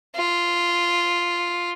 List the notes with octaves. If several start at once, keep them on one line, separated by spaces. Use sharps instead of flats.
F4